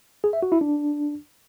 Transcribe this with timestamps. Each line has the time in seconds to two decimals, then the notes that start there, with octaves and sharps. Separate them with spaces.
0.24 G#4
0.33 E5
0.43 F#4
0.52 E4
0.61 D4